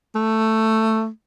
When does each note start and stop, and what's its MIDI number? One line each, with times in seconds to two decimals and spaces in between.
0.15 1.09 57